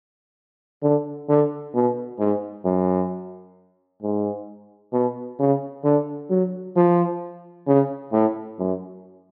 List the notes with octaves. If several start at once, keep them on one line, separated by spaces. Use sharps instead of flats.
D3
D3
B2
G#2
F#2
G#2
B2
C#3
D3
F#3
F3
C#3
A2
F#2